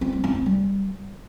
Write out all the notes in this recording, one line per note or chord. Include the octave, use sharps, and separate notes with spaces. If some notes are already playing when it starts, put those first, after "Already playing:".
C4
G3
C4
E4
G3